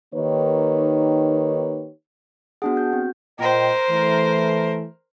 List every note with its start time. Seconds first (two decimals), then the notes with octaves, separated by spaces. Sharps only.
0.15 D#3 A#3 D#4 G4 B4 C#5
2.62 B3 D4 F#4 G#4 F#5
2.75 F#4 G6
2.93 C4
3.39 A#2 A#4 C5 D#5 G5
3.90 E3 A3